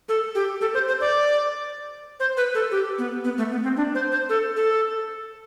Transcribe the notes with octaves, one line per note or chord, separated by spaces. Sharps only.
A4
G4
A4
C5
C5
D5
C5
B4
A4
G4
B3
B3
A3
B3
C4
D4
C5
C5
A4
A4